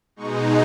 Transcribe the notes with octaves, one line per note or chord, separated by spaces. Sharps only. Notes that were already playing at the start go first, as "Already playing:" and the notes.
B2 G#3 D#4 C#6